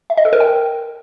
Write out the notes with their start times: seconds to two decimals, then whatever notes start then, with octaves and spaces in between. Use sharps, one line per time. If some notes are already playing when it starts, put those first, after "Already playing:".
0.10 E5
0.17 D#5
0.25 A4
0.33 A#4
0.40 G5